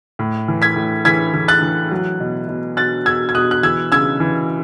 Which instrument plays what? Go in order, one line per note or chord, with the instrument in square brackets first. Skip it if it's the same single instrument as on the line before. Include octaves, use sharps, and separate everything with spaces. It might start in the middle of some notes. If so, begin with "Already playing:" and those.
[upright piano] A2
E3
G#6 B6
A2
E3 G#6 B6
E3
F#6 A6
E3
F#3
B2
B2
B2 F#6 A6
B2 E6 G#6
G#6
B2 D#6 F#6
F#6
E3 E6 G#6
C#3 E6 G#6
E3